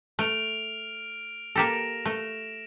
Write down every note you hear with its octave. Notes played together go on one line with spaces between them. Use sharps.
A3 F6 D7 F7
A#3 G4 A4 A#6 D7 E7
A3